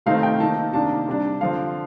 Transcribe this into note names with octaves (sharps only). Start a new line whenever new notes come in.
C3 D#3 A3 C4 D#4 F5
G5
D#3 A#3 D#4 A5
C3 D#3 A#3 D4 A5
C3 G3 D4
D3 F3 C4 F5